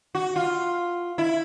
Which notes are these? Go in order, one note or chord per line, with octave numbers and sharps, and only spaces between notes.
F#4
F4
E4